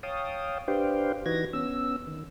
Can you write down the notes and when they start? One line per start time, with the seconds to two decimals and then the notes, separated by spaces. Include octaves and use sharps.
0.03 C#5 F5 G5 A5 D#6
0.68 D4 G4 B4 C5 F5 G5
1.26 E3 D#4 F#4 B4 G#6 A#6
1.53 B3 C#4 E6
2.07 D#3